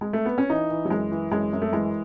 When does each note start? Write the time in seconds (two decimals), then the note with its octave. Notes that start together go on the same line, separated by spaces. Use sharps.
0.01 G#3
0.13 A3
0.25 B3
0.38 C#4
0.50 E3 D#4
0.71 E3
0.85 F#3
0.90 F#2 G#3
1.12 E3
1.31 F#2 G#3
1.53 F#2
1.62 A3
1.72 E3 G#3